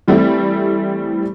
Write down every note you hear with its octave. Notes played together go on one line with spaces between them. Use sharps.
E3 G3 A3 C4 E4